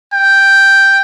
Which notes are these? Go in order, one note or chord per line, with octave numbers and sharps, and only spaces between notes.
G5